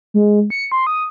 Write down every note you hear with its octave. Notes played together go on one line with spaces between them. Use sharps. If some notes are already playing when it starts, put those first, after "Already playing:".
G#3
C#7
C6
D#6